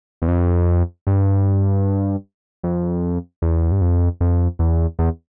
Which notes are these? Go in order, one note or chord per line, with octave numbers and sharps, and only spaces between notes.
E2
F2
G2
F2
E2
G2
F2
F2
E2
E2